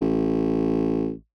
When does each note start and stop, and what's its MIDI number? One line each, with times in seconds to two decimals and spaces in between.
0.01 1.12 33